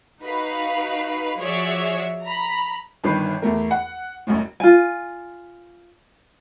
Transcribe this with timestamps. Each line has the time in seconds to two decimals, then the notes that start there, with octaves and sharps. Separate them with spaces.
0.22 D#4 F#4 B4 F5
1.38 F3 F#4 G#4 C#5 D5 E5
2.24 A#5 B5
3.04 G1 G2 D#3 B4 C7
3.42 E2 A3 A#4
3.71 F#5
4.27 E1 A1 F#2 A2
4.60 F4 G#5